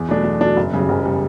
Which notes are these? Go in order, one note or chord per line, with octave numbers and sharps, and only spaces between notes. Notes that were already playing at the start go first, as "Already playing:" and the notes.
Already playing: E2
B2 F#3 A3 D4
E2
B2 F#3 A3 D4
F#1
F#2 C#3 G3
F#1
C#3 G3